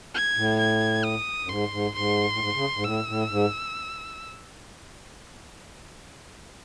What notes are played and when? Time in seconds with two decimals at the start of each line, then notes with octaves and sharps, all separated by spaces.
0.15 G#6
0.36 A2
0.59 G#6
1.04 D#6
1.44 F#2
1.49 G#2 C6
1.71 G#2
1.94 G#2 C6
2.31 A2
2.39 G#2
2.55 C#3
2.75 G#2
2.84 A2 E6
3.08 A2
3.30 G#2